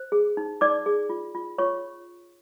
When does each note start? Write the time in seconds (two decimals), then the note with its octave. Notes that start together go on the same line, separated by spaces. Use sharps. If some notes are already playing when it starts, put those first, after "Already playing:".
Already playing: C5
0.12 G#4
0.37 D#4
0.61 D#4 D5 D6
0.86 G#4
1.10 F4
1.35 F4
1.58 F4 C#5 C#6